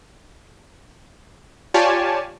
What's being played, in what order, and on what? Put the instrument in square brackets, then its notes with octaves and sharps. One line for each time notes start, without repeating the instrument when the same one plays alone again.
[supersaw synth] F4 G4 C#5 D5 G#5 A5